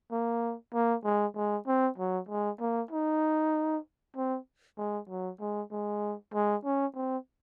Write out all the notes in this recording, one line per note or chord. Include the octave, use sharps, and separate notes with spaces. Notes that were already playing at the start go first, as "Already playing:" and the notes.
A#3
A#3
G#3
G#3
C4
F#3
G#3
A#3
D#4
C4
G#3
F#3
G#3
G#3
G#3
C#4
C4